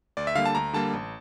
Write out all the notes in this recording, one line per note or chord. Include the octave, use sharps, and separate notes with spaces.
D2 D5
E5
D3 G3 A#3 F5
A5
D2 A#5
D3 G3 A#3 A5
A1